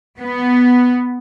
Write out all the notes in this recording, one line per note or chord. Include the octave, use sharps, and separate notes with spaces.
B3